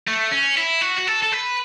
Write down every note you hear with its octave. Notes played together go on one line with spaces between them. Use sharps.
A3
C#4
E4
F#4
F#4
A4
A4
B4